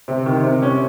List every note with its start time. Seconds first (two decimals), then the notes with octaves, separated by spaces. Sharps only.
0.08 C3
0.26 D#3
0.44 C3
0.62 C#4